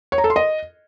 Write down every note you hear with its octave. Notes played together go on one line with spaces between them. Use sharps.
C#5
A#5
A4
C6
D#5